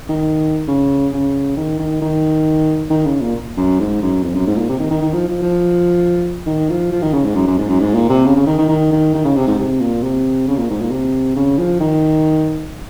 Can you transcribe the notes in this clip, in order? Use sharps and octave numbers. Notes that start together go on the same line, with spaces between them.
D#3
C#3
C#3
D#3
D#3
D#3
D#3
C#3
A#2
F#2
G#2
F#2
F2
F#2
G#2
A#2
C3
D#3
D#3
D#3
F3
F3
F3
D#3
F3
F3
D#3
C#3
G#2
F#2
F#2
G#2
F#2
G#2
A#2
C3
C#3
C#3
D#3
D#3
D#3
D#3
D#3
C#3
C3
G#2
C3
A#2
C3
C#3
A#2
G#2
A#2
C3
C#3
F3
D#3